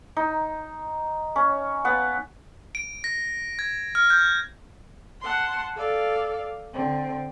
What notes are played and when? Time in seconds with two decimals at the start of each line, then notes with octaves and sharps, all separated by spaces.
0.16 D#4
1.36 C#4
1.85 B3 F#5
2.75 D7
3.04 A#6
3.59 G#6
3.95 F6
4.10 G6
5.20 F#5 A5 C6
5.75 A4 D5 F5
6.73 D3 C4